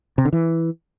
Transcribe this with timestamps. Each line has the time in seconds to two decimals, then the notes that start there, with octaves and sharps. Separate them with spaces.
0.18 C3
0.25 D3
0.33 E3